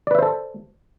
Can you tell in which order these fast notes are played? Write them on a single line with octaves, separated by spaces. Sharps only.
D5 B4 E5 C5 A4